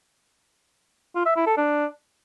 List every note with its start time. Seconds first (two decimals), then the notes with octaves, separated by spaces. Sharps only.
1.15 F4
1.26 E5
1.36 E4
1.47 A4
1.57 D4